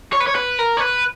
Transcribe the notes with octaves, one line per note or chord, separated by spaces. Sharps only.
C#5
B4
C#5
B4
A#4
C#5
B4